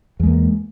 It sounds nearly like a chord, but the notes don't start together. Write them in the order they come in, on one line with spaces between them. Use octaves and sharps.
E2 G#3 A#3